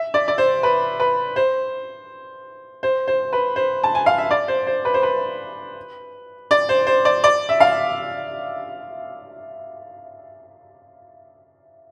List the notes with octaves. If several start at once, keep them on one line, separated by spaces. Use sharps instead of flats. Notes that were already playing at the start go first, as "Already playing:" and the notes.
Already playing: E5
D5
D5
C5
B4
B4
C5
C5
C5
B4
C5
A5
G#5
F5
E5
D5
C5
C5
B4
C5
B4
D5
C5
C5
D5
D5
E5
F5